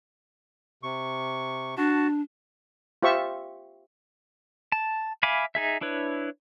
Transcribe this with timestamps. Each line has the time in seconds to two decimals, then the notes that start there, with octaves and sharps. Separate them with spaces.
0.83 C3 C#6
1.77 D4 F#4 A5
3.03 F4 G4 C5 E5 C#6
4.72 A5
5.23 E5 F5 G#5 B5 D6
5.55 D#4 G#4 E5
5.81 D4 E4 B4 C#5